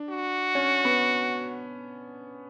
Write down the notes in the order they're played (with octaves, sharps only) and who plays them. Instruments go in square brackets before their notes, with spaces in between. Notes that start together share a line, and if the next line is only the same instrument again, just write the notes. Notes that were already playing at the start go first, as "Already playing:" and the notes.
Already playing: [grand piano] D4
[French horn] F#4
[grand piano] C#4
B3